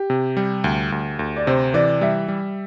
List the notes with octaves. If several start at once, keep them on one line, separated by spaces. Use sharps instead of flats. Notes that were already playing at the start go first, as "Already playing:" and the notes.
Already playing: G4
C3
G3
D2
D2
D2
D5
C3 C5
E3 D5
G3 E5
G3